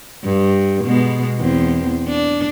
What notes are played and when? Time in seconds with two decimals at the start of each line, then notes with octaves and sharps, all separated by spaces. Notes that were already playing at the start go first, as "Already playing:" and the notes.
0.24 G2
0.85 B2 G#3 B3
1.38 E2 C4
2.07 D4